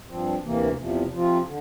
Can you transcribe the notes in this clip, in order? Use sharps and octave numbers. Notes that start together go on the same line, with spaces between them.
G2 F3 C4
D2 C3 E3 A#3
E2 C3 F3
C3 F3 C4 F4
D3